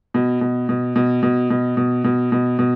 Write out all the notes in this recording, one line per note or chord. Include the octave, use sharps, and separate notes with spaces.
B2
B2
B2
B2
B2
B2
B2
B2
B2
B2